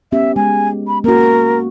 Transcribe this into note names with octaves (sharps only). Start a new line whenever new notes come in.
B3 C#4 G4 E5
G#3 G#5
B5
A#3 C#4 F#4 A#4